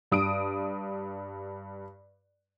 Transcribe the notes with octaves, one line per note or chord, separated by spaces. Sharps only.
G2 D#6 D7